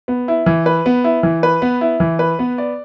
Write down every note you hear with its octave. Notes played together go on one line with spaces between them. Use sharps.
B3
E4
E3
B4
B3
E4
E3
B4
B3
E4
E3
B4
B3
D5